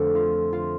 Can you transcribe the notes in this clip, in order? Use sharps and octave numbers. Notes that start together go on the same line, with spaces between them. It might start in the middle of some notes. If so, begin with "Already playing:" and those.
Already playing: F2 D3 A3 A4
F4
F4